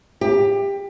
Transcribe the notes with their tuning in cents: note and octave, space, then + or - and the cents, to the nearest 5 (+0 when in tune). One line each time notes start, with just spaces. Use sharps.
G4 +20